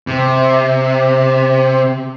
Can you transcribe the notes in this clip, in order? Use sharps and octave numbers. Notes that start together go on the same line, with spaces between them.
C3